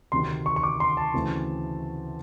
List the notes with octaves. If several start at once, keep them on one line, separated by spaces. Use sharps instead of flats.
D2 C3 D#3 C6
C#6
C#6
D6
C6
A5
D2 C#3 E3 A3 C4